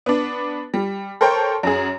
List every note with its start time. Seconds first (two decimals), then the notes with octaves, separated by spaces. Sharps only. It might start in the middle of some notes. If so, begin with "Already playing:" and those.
0.06 B3 D4
0.74 G3
1.21 A4 A#4 C5 C#5 G5
1.63 F#2 G#4